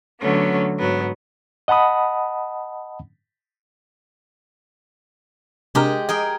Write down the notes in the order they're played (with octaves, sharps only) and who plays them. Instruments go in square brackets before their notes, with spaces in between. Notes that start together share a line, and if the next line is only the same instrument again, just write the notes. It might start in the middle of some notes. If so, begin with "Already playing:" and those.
[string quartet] D3 F#3 A3 B3 C#4
G#2 F#3 B3
[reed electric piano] D#5 F#5 A5 B5 D#6
[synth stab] C3 D4 A#4 [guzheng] G#3 G4 D#5
[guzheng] G#4 A#4 G5 [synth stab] D#5